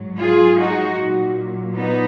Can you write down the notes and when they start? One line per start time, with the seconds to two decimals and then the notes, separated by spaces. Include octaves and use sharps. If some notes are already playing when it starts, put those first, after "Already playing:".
Already playing: G#2 F#3
0.20 F4 G#4
0.59 D#4 F#4
0.98 A#2 F#3
1.75 B3 D#4